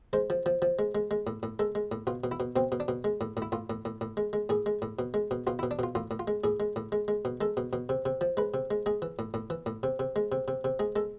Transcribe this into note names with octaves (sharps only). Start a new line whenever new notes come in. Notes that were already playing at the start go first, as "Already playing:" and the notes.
G#3 C5
F3
F3
F3
G#3
G#3
G#3
A2
A2
G#3 A4
G#3
A2
B2 F4
B2
E4
B2
B2 C4
B2
D4
B2
G#3
A2
A2
E4
A2 F4
A2
A2
A2
G#3
G#3
A2 G#4
G#3
A2
B2
G#3
B2
B2 F4
E4
B2
D4
B2 F4
A2 F4
A2
F4
G#3
A2 G#4
G#3
A2
G#3
G#3
B2
G#3 A4
B2
B2
C3
C3
F3
G#3 B4
C3
G#3
G#3 G#4
E3
A2
A2
E3
A2
C3
C3
G#3
C3
C3
C3
G#3 G#4
G#3 A4